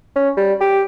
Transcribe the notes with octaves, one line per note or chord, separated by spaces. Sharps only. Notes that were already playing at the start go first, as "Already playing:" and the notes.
C#4
G3
G4